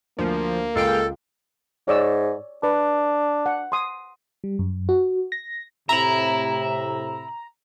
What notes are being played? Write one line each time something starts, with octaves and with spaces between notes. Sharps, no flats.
D2 F3 A#3
C#2 G#3 A4 F5 G5
G#2 C#5 D5 E6
D4 B4
F#5
C6 D#6
G3
F#2
F#4
A#6
A2 C3 E5 A#5 B5